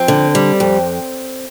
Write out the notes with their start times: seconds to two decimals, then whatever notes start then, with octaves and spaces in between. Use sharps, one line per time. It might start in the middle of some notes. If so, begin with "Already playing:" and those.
Already playing: F2 C4
0.08 D3
0.35 G3
0.60 F2